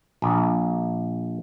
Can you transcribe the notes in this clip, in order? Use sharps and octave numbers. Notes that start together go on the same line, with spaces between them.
A#1